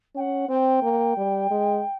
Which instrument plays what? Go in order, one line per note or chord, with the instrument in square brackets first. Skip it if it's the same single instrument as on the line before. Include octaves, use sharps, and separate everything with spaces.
[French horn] C#4 [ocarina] G5
[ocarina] F#5
[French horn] C4 [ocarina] G5
[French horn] A#3
G3
G#3